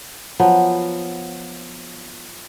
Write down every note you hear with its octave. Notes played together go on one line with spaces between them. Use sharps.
F3 F#3 B3